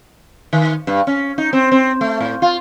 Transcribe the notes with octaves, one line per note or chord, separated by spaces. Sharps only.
D#3
G2
C#4
D#4
C4
C4
A3
A2
F4